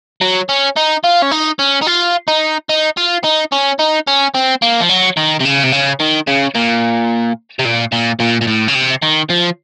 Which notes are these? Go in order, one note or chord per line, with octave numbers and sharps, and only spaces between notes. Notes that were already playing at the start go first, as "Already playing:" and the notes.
F#3
C#4
D#4
F4
C#4
D#4
C#4
D#4
F4
D#4
D#4
F4
D#4
C#4
D#4
C#4
C4
A#3
F3
F#3
D#3
C3
C#3
C3
C#3
D#3
C#3
A#2
C3
A#2
A#2
A#2
A#2
A2
C#3
C3
D#3
F3